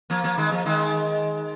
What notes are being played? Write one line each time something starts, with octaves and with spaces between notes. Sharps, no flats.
F3 A#3
F3 A#3
D#3 G#3
F3 A#3
D#3 G#3